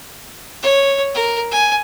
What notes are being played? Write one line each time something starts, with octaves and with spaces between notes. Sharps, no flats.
C#5
A#4
G#5